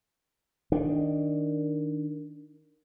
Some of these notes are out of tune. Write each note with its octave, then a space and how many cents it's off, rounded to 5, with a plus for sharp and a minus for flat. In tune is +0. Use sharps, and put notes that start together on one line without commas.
D#3 +0 D4 +0